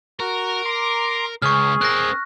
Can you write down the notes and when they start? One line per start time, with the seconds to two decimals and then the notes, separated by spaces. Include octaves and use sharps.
0.20 F#4 A#4
0.65 A#5 C6 D6
1.42 C#2 G#4 C#6 F6
1.81 C4 A#4 F#6 A#6